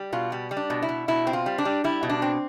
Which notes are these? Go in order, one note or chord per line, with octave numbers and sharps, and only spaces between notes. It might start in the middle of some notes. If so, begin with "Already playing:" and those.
Already playing: G3
B2 F4
G3
G3
D4
B2
E4
B2
B2 E4
C4
F4
G3
D4
G3
G3 E4
B2
D4
C4